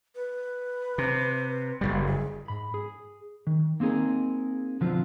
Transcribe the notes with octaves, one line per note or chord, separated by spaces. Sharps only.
B4
C3
F#1 C2 G3
G#4
G#2 B5
G#4
D#3
A#3 C4 D#4 G#4 A#4
B1 D3 F3 F#3 C4 F4